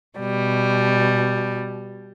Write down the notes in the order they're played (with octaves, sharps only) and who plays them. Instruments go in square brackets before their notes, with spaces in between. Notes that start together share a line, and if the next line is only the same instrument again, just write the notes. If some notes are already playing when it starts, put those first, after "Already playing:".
[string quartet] B2 G3